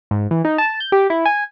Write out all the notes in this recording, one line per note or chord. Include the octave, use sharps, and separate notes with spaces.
G#2
E3
D#4
A5
G6
G4
E4
G#5